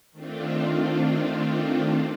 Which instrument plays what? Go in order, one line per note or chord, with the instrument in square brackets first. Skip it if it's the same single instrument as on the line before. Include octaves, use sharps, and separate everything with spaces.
[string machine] D#3 A3 C4 D4 F4